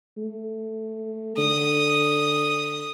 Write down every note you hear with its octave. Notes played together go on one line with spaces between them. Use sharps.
A3
D3 D#6